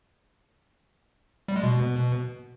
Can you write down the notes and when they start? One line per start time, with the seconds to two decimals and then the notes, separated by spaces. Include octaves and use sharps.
1.48 G3
1.56 G#3
1.63 B2